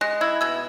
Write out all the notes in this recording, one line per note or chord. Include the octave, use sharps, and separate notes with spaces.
G#3 F#6 A#6
E4 E6 G#6
B2 E6 G#6